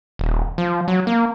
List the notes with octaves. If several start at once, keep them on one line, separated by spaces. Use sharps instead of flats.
D#1
F3
F#3
A#3